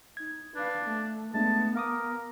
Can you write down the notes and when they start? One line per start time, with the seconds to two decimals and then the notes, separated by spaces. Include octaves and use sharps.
0.17 D#4 G#6
0.56 D4 B4 F5
0.86 A3
1.34 G#3 A3 B3 D4 A5
1.76 A#4 F5 D6 D#6